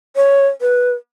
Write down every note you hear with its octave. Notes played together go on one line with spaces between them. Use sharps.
C#5
B4